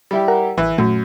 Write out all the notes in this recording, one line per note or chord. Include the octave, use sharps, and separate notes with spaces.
G3 E4 G4
A#4 F#5 A#5
A1 E3
F#2 A#2 A3